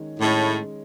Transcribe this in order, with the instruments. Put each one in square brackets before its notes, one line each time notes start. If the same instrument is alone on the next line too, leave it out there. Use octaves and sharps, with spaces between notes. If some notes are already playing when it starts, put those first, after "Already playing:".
Already playing: [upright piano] D#3 G#3 C#4
[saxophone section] A2 [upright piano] G#3 C#4